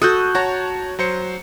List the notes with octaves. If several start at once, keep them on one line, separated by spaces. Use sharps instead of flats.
F#4 A4 D#6 F#6 G6
F#4 C#5 A5 A#5
F#3 C5 C#7